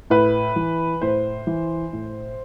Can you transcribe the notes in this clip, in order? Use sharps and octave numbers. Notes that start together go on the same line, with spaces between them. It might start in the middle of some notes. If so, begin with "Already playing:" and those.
A2 B4
E3
A2 C5
E3
A2